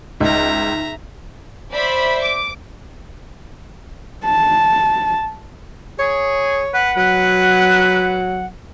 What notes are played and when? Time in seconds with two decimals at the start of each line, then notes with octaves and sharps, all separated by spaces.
0.21 C#2 D#4 E5 A#5
1.72 C5 D5 E5 B5
2.22 D6
4.26 A5
5.99 G#4 C#5
6.74 B4 F#5
6.97 F#3 B4